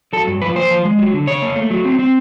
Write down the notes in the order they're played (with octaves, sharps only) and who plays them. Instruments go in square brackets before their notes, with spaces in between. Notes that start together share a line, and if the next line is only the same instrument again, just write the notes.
[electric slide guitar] F#3 A4
G2
F3 B4
A#3 C5
F3
G#3
F#3
D3
C#3 C#5
A#3
A3
F#3
C4
C4